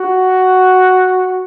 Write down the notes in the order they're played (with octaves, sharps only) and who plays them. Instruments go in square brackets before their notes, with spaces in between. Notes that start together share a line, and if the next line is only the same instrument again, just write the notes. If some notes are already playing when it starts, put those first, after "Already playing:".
Already playing: [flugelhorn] F#4